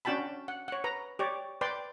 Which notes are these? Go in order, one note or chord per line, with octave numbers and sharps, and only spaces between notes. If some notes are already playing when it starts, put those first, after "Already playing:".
C#4 D4 F#4 G5 A5 B5
F#5
C#5 F#5
B4 A#5
G4 C#5 D5
B4 D5 G5 C6